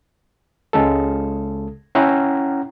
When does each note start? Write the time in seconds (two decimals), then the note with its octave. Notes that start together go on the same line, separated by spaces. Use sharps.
0.73 C#2 C#3 G#3 A4
1.95 C#4 E4 F#5 G5 A#5